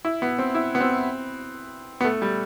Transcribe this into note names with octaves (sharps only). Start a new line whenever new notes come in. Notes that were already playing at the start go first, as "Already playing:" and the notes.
E4
B3
C4
E4
B3
C4
B3
A3
G3